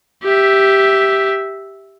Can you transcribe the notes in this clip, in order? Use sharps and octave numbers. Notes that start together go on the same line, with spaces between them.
G4 E5